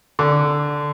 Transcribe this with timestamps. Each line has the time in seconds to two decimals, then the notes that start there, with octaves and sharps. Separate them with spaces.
0.19 D3